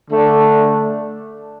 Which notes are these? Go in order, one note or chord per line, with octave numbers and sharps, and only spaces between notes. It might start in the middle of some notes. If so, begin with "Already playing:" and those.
D3 A3 D4